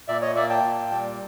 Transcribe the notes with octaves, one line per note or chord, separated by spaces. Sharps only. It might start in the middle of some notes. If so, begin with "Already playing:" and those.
A#2 D5 E5
C#5 D#5
A#3 D5 E5
G5 A5
A#2
G3